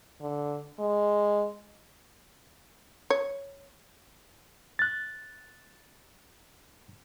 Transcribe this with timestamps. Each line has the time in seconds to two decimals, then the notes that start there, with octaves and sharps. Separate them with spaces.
0.21 D3
0.80 G#3
3.10 C#5
4.79 F#6 A6